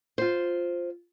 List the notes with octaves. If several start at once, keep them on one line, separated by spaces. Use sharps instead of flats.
F4 C5